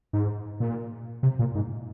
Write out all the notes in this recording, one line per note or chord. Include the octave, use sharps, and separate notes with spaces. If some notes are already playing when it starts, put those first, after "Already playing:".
G#2
A#2
C3
A#2
G#2